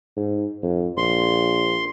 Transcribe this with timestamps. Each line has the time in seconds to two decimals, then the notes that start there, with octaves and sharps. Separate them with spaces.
0.17 G#2
0.63 F2
0.97 A#1 C6